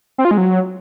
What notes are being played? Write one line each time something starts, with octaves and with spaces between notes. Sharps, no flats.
C4
F4
G#3
F#3